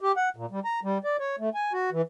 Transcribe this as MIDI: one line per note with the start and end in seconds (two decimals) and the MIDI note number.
0.01 0.12 67
0.17 0.29 78
0.36 0.46 46
0.51 0.60 55
0.65 0.80 82
0.83 0.98 55
1.04 1.17 74
1.19 1.36 73
1.39 1.49 57
1.54 1.72 80
1.73 1.90 66
1.92 2.02 52